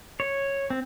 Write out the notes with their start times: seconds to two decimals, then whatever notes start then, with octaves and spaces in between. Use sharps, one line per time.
0.20 C#5
0.70 C4